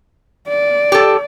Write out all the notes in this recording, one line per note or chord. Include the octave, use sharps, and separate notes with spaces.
D5
G4 A4